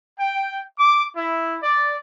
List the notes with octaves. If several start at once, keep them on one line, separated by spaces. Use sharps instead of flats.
G5
D6
E4
D5